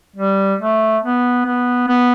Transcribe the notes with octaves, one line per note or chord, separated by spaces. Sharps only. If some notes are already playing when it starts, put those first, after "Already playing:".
G3
A3
B3
B3
B3